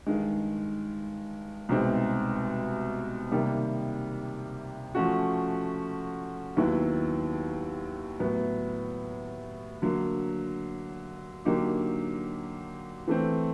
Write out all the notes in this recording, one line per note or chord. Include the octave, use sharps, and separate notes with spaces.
G2 D#3 G#3
C2 B2 G#3 C4 D#4
C3 D#3 G3 A#3
F3 A3 C#4 F#4
D#2 D#3 F#3 B3 E4
A2 F#3 B3
D3 F#3 A#3
D3 F#3 A#3 D#4 G4
E3 A3 C4